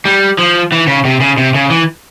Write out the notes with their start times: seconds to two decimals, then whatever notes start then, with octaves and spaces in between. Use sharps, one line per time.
0.05 G3
0.38 F3
0.72 E3
0.87 C#3
1.05 C3
1.20 C#3
1.38 C3
1.55 C#3
1.70 E3